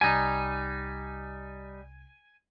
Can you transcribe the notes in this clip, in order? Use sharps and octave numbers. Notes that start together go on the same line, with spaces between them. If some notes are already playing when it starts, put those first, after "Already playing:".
C2 G3 D#4 G#5